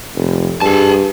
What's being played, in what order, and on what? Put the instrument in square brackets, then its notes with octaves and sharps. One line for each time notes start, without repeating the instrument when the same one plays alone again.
[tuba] F1
[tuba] G2 [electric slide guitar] G#4 A5